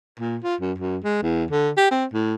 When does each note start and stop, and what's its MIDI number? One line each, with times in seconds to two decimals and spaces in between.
0.19 0.37 46
0.43 0.55 65
0.61 0.73 42
0.78 0.98 42
1.04 1.21 56
1.22 1.44 40
1.51 1.70 50
1.77 1.89 67
1.91 2.05 60
2.13 2.35 45